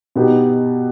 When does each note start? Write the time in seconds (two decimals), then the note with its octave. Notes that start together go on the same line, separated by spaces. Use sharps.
0.16 B2 B3 D#4 G4